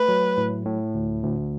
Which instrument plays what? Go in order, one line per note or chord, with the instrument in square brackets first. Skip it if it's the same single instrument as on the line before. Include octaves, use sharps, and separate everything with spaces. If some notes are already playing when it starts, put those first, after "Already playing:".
Already playing: [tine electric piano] A3 [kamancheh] B4
[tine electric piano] F#3
A2
A2
D2
D2